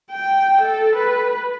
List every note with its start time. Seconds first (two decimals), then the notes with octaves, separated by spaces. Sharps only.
0.11 G5
0.62 A4
0.96 B4